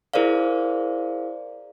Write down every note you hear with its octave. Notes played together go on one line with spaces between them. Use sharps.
E4 G#4 A#4 C5 D5 F5